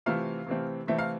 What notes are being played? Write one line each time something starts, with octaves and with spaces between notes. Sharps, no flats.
C3 E3 A3 C4 F4 F5
C3 E3 A3 C4
C3 E3 A3 C4 E5
F5